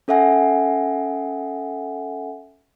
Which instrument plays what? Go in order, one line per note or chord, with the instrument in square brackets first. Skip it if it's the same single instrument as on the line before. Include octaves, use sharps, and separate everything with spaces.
[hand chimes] C#4 A4 E5 F#5 G#5